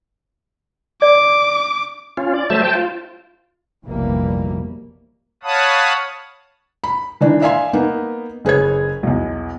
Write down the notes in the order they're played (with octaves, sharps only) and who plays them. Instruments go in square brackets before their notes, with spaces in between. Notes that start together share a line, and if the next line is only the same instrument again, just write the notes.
[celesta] D5 [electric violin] D6
[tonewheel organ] C#4 F4
D5
F#3 A3 C5 E5 A5
C5 G5 A5
F4
[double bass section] F1 A#1 B2 E3 G3 A#3
[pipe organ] C#5 F5 F#5 A5 B5 D#6
[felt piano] B5
D#3 E3 D4
D5 E5 F5 G#5 C6
A#3 B3 D#4
F#1 G#4 B4 C#5 G#6
B1 E2